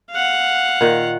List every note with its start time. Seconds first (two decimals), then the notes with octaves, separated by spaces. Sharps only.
0.11 F5 F#5
0.81 A#2 D#3